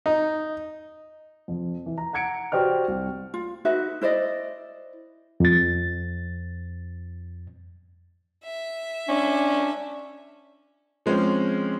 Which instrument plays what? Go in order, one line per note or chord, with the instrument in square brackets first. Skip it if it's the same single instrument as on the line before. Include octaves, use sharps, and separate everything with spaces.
[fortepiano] D#4
[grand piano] F2
E3
A#5
F#5 A#5 G#6 C#7 D7
F#4 G4 C5 D5 F6
C2
[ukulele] F4
D#4 F#4 B4 E5
E4 C5 D5 D#5
[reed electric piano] F2 A6
[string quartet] E5
[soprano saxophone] C#4 [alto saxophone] D4
[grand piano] F3 G#3 C4 C#4